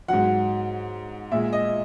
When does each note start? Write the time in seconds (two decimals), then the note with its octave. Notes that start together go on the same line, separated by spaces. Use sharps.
0.08 G#2 F#3 F#5
1.31 A#2 G#3 E5
1.53 D#5